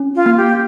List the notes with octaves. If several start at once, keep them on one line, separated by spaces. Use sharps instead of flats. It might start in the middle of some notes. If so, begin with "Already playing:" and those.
Already playing: C#4
F4
A#3
G4